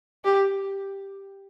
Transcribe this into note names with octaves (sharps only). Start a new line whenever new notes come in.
G4